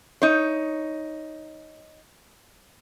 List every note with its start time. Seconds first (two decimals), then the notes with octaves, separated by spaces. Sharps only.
0.22 D#4 C#5